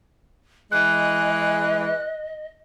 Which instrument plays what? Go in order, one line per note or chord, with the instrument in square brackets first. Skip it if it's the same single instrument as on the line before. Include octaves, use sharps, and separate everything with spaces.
[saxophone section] E3 G#3 [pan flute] D#5 [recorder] F#6